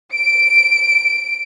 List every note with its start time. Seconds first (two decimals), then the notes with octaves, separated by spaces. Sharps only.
0.14 D7